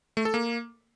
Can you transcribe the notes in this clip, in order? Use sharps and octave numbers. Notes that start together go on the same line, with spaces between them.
A3
A4
A#3